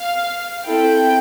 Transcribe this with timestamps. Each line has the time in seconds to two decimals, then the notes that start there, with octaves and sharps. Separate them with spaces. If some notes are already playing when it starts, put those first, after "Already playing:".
Already playing: F5
0.66 C4 E4 A4 G5